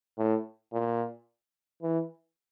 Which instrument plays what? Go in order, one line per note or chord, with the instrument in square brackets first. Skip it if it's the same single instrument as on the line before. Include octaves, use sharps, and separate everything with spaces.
[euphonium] A2
A#2
E3